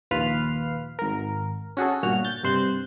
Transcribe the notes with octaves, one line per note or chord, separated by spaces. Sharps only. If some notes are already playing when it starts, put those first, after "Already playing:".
A#1 D#2 F4 B4 F6 C7
G#1 A#4
C#4 F#4 G#4 A4
G1 A#2 F#4 F6
G6 A6
G2 C3 C5 F#6 G6